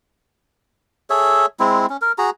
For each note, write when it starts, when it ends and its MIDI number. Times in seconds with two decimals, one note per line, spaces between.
1.10 1.46 68
1.10 1.46 69
1.10 1.46 73
1.10 1.46 76
1.60 1.86 56
1.60 1.86 60
1.60 1.86 64
1.90 1.97 61
2.02 2.12 70
2.18 2.30 66
2.18 2.30 68
2.18 2.30 82